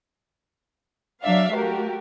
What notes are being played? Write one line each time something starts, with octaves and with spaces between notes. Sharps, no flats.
F#3 D4 D5 E5 F5
A3 F#4 G4 A#4